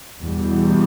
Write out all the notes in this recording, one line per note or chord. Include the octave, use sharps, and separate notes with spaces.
E2 B2 G3